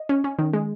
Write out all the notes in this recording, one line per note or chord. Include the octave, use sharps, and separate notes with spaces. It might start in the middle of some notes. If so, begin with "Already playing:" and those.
Already playing: D#5
C#4
C#4
D#3
G#3